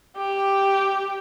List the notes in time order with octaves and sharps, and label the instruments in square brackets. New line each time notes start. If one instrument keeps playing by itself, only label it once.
[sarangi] G4